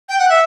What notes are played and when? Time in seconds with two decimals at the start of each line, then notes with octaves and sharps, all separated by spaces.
0.09 G5
0.19 F#5
0.29 E5